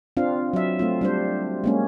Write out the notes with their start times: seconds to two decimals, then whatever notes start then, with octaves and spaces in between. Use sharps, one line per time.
0.17 C4 D4 F4 F5
0.53 F#3 E5
0.79 A3 C4 F4
1.01 G3 D4 C5
1.64 G#3 A#3 C#4